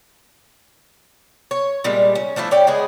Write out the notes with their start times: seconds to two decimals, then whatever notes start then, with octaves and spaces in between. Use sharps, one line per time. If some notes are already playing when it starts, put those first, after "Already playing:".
1.51 C#5
1.84 A#2 G3 G#3
2.15 C#4
2.36 F3 A3 D4 E4
2.51 C#5 D5 G5
2.67 C#3 G#3 B3 G#4